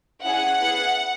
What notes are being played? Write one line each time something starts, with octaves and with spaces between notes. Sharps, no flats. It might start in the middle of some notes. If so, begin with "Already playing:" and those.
C#4 E4 G#4 F#5
B3 E4 G#4